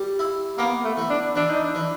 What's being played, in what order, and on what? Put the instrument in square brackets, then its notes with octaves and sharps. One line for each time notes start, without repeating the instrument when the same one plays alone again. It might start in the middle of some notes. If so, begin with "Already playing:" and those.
Already playing: [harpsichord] G3
E4
[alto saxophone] A#3 [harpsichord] B3
[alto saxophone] A3
[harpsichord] E3
[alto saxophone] D4
[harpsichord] E3 [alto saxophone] D4
[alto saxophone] D#4
D4
[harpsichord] E3